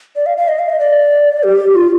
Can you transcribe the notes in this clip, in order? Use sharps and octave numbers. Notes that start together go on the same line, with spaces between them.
D5
F5
F5
D#5
F5
D#5
D5
G4
F4